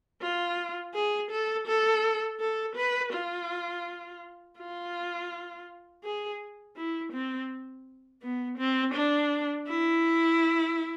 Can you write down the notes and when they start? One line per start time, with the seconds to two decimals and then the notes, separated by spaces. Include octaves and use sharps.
0.22 F4
0.94 G#4
1.31 A4
1.67 A4
2.40 A4
2.76 B4
3.13 F4
4.58 F4
6.04 G#4
6.76 E4
7.12 C4
8.22 B3
8.58 C4
8.94 D4
9.68 E4